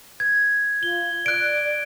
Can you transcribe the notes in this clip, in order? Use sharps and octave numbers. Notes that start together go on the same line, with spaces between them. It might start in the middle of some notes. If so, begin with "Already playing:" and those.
G#6
F4 G7
D5 F#6 D7